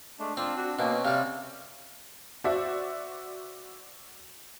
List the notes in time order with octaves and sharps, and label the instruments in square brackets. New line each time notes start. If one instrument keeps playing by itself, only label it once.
[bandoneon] G#3 A3 D4
[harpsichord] C4 [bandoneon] D4 F4
[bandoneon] D4 [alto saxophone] F#4
[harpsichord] B2 [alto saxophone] A#3 [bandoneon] C4 C#4
[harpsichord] C3 G3 [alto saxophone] F5
[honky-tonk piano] F#4 C5 D5 E5